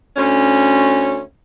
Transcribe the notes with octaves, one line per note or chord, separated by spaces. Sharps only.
D2 C#4